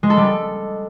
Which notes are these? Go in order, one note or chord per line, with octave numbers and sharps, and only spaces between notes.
G#3
A4
G3
A4